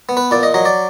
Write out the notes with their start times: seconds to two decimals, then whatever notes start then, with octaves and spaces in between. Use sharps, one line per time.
0.09 B3
0.17 B4
0.31 A#2 D5
0.43 D#5
0.54 F#3 D#5
0.65 D5